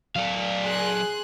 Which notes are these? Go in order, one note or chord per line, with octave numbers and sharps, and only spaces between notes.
F#3 A4 D5 F5
G#4 C6 F#6